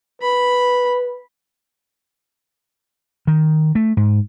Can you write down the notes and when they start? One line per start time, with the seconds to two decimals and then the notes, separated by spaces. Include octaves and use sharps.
0.22 B4 B5
3.27 D#3
3.75 A3
3.97 G#2